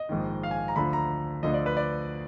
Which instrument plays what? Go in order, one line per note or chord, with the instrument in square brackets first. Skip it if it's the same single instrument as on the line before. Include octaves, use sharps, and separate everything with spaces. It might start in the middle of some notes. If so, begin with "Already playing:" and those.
Already playing: [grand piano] D#5
A#1 G#2 D#3
F5
G#5
A#5
D2 D3 F3 B5
A#5
D2 D3 F3 D#5
D5
B4
D5